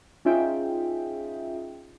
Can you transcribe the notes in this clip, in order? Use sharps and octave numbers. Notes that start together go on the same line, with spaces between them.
C#4 D#4 F4 G#4 E5 G5